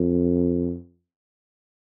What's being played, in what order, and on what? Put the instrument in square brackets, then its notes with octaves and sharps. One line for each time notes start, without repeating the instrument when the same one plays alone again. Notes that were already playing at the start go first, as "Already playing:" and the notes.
Already playing: [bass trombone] F2